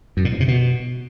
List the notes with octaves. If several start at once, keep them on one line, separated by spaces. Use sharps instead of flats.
F#2
A#2
G#2
C3
B2